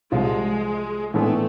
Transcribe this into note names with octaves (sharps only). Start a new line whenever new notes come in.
C2 C3 F3 G#3
A2 E3 G#3 A3 B3 D4